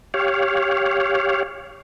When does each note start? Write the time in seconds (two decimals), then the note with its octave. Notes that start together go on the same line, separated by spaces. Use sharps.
0.14 G4 C#5 F5